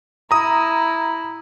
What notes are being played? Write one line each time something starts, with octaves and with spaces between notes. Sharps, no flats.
E4 A#5 D#6